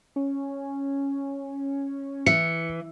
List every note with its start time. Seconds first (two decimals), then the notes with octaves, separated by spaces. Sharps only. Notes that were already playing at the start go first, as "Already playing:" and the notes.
0.16 C#4
2.26 E3 C#7